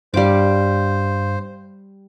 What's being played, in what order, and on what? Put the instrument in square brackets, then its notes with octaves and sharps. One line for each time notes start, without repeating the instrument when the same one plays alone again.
[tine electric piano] G2 F5 [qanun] G3 D6 [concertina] C5